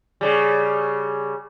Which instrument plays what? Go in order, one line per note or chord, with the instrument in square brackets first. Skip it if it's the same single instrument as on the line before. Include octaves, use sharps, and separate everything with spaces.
[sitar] C#3 G3